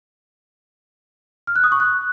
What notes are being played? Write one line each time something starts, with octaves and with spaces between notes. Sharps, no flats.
F6
F#6
D#6
C#6
F#6